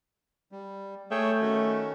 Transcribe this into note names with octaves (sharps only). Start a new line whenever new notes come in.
G3
A3 G#4 C#5 G5
D#3 C#4 F#4